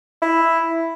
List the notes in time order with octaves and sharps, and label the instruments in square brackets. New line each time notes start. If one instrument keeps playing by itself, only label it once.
[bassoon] E4